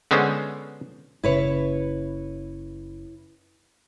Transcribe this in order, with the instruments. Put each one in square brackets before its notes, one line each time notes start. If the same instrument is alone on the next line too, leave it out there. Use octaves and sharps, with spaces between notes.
[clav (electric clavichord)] D3 G#3 B3 C#4 C5
[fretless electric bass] F#1 C#3 [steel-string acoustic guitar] E4 B4 C#5